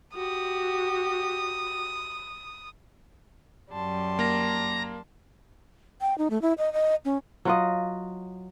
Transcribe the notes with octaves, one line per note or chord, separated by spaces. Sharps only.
F#4 G4 D#6
F#2 G3 A5 C6
A#3 A#5
G5
D#4
A3
E4
D#5
D#5
C#4
F#3 F4 D#5